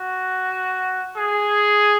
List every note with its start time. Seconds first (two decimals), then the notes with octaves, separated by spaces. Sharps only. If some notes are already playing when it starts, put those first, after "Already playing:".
Already playing: F#4
1.17 G#4